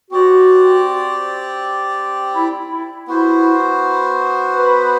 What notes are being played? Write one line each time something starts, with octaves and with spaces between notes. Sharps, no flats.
C4 F#4 G4 D5
E4
E4
B3 E4 F#4 C5
B4